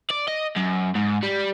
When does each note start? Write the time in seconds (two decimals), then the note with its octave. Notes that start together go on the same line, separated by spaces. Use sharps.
0.11 D5
0.28 D#5
0.57 F#2
0.95 G#2
1.23 G3